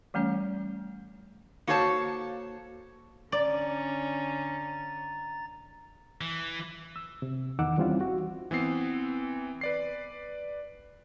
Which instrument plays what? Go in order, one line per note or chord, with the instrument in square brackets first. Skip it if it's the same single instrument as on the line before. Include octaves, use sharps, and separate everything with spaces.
[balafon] E3 G3 A3 C#4 C#5
[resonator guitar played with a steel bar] A#3 F#4 A4 C5 C#5 A5
[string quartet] D3 C#4 [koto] D5 [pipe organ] A#5 A6
[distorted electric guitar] E3
[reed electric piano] E6
C3
E2 D#3 D#4 F#5 D6 E6
E3 G3 C4 C#4 E4 F4
F#4
[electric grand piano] E3 B3 C4 C7
B4 D5 C7